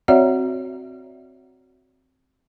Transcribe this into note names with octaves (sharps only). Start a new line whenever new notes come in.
C4 F#4 C#5 D5 E5 F#5